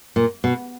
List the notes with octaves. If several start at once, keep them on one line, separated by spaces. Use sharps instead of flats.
A#2
B2